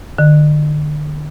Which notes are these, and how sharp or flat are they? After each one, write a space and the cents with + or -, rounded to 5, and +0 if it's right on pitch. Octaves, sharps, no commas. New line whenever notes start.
D3 +35